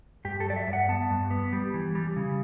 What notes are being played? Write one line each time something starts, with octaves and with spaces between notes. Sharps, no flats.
G2 G4
A4
F#3 D5
E5
G2
F#5
B3 A5
G2
B3
G3
E3
G3
C#3